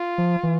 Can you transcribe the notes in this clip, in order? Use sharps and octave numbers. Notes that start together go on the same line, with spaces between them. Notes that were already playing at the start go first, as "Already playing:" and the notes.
Already playing: F4
F3
E3